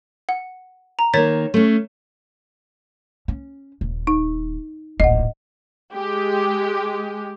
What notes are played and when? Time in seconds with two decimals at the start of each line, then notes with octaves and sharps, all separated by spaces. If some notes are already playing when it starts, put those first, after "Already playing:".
0.29 F#5
0.99 A#5
1.14 D#3 A#3 C#5 A6 B6
1.54 A3 C#4
3.28 C#4
3.81 D#1
4.07 D#4
5.00 D1 A#1 D#5 F#5
5.94 G#3 G4